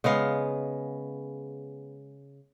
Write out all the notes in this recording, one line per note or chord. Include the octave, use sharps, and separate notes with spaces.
C#3 G#3 B3 F5